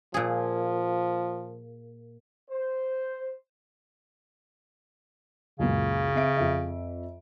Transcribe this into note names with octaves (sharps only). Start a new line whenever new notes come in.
A#2 F3 G#4
C5
C#2 F#2 A#2 C#3
C4 E5 D7
F2 E5